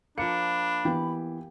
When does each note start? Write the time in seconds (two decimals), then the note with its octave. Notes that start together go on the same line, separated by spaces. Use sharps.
0.18 F3 A#3 D4 B5 C#7
0.85 E3 B3 G4